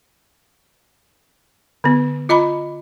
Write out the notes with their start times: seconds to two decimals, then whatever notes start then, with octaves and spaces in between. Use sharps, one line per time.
1.84 D3 B3
2.29 F4 D#5 A#5 B5